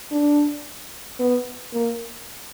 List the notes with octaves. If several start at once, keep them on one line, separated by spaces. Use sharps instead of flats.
D4
B3
A#3